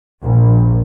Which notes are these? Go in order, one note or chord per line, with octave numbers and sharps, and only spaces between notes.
A#1